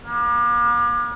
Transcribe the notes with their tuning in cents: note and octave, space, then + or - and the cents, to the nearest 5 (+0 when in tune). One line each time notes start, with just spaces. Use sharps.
A#3 +45